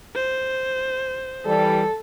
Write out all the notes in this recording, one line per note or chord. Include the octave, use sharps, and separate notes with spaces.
C5
E3 G3 A4